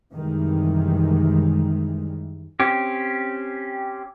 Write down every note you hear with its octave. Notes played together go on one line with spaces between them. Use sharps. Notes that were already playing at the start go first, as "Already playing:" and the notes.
F#2 C3 D#3 E3 G3 G#3
C4 C#4 G4